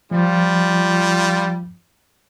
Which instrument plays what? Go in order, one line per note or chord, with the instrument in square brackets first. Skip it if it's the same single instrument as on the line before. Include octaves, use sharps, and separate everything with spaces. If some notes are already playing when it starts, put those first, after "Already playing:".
[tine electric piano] F3 [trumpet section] G3 F4